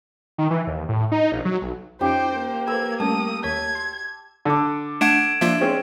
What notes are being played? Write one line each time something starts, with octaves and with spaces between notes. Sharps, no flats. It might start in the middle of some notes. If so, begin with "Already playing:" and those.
D#3
E3
D#2
A2
D#4
A#1
F#3
B1
F2 C#4 D#4 F4 G4 C5 G5
A#3
A4 B4 C5 E6 G#6
G3 A3 C#4 A5 D#6
D#2 C#5 G#6 B6
C6
D3 A4 D6
A3 D4 F#5 G#6 D7 E7
F3 A#3 D4 F4 E5
G#3 C4 C#4 G#4